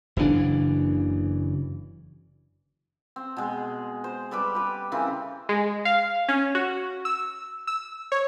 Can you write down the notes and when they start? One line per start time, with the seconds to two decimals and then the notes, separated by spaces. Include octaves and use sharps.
0.17 F#1 C#3 E3 D4
3.16 C4
3.37 B2 G#3
4.04 C5
4.31 G3 A4 B4 D6
4.55 G4 B4
4.92 C#3 E3 C4 A#4
5.49 G#3
5.85 F5
6.29 C#4
6.55 F#4
7.05 E6
7.67 E6
8.12 C#5